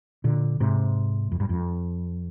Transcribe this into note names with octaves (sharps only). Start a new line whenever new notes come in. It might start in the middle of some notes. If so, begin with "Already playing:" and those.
A#2 D3
G#2 C3
F2
G2
F2